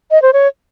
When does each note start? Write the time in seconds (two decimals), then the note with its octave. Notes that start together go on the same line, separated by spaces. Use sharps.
0.11 D#5
0.22 C5
0.33 C#5